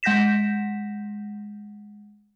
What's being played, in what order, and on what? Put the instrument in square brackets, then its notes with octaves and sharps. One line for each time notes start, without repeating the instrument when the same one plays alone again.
[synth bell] G#3 F#5 G6 A#6 B6 E7